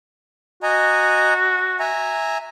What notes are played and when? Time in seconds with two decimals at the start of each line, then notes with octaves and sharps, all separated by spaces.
0.63 F#4 D#5 G#5 A#5
1.80 E5 G#5 A#5